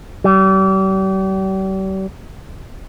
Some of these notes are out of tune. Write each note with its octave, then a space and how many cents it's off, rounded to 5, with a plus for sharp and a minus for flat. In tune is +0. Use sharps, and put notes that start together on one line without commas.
G3 -40